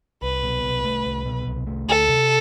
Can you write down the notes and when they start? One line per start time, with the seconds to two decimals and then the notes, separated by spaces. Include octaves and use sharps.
0.23 C2 B4
0.43 B2
0.64 C2
0.85 A3
1.05 C2
1.26 B2
1.47 C2
1.67 A3
1.88 D2 A4
2.09 C3